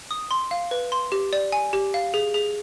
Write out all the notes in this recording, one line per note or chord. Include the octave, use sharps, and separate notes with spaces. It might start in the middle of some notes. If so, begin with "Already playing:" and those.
D#6
C6
F5
B4
C6
G4
D5
G#5
G4
F5
G#4
G#4